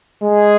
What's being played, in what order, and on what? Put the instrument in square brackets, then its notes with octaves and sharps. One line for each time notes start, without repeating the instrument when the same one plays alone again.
[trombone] G#3 [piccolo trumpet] G#4